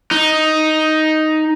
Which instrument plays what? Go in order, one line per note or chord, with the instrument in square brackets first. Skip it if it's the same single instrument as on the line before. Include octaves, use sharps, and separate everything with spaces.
[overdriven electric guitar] D#4